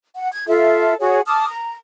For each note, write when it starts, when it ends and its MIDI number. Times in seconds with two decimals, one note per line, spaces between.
0.16 0.29 78
0.33 0.45 92
0.48 0.94 65
0.48 0.94 69
0.48 0.94 76
1.00 1.20 66
1.00 1.20 68
1.00 1.20 73
1.00 1.20 78
1.27 1.45 81
1.27 1.45 86
1.27 1.45 87
1.27 1.45 89
1.47 1.75 82